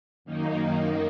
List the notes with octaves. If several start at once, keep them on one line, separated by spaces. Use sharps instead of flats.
F#2 D#3 A#3 D#4